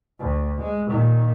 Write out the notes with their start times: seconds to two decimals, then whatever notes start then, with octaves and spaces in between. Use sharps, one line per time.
0.20 D2
0.61 G#3
0.91 A#2 D#3